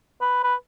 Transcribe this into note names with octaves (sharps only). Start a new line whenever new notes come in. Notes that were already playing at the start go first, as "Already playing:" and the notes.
B4
B4